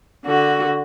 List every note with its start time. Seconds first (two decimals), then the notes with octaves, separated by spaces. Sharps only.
0.25 D3 F#4